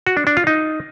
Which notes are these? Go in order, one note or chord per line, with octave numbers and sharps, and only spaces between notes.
F#4
D4
D4
F4
D#4